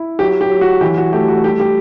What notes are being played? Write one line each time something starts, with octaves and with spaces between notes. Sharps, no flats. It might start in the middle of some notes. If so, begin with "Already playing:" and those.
Already playing: E4
F#3 G4
G4
F#3
F#4
E3 G4
F#4
A3 G4
F#4
G3 G4
G4